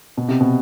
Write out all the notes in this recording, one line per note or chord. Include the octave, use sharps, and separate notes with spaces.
B2
C3
B2